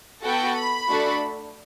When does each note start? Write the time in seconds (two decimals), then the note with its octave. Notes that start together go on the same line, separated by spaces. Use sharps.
0.24 B3 F#4 A4 G5
0.56 B5
0.88 A3 D4 F#4 A4